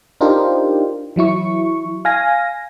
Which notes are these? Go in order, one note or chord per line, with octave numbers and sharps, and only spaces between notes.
D4 D#4 F4 G4 A#4 C5
E3 F#3 E4 C#6
F5 G#5 A#6